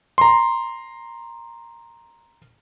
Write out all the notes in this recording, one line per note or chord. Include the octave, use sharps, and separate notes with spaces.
A#5 C6